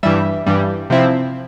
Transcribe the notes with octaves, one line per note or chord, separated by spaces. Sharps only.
G2 E3 G3 E5
G2 E3 G3
C3 F3 C4 E4